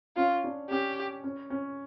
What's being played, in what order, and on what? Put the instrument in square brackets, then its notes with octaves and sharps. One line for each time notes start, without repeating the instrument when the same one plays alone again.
[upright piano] C#4 [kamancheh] F4
[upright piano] D4
[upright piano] C#4 [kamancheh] G4
[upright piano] C#4
C#4